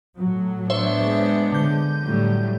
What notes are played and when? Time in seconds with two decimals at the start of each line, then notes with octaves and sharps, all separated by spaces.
0.18 A2 F#3
0.70 B3 D4 C5 C#5 E5
1.01 G#3
1.52 D3 G6
2.04 A2 F#3 G3